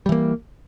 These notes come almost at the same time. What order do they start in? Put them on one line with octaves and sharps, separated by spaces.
G3 E3 A#3